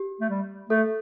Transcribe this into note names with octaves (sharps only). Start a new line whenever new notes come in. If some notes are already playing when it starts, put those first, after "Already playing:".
Already playing: G4
A3
G3
A3 A4